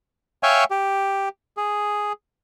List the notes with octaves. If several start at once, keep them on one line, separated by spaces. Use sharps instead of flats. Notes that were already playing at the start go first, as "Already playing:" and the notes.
C#5 E5 F5 G5 G#5 C#6
G4
G#4